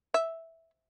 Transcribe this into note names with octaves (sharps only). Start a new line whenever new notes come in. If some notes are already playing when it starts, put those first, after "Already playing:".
E5